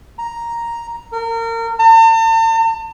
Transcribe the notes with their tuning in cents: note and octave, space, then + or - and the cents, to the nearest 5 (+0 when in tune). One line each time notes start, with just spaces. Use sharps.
A#5 +5
A#4 -30
A5 +45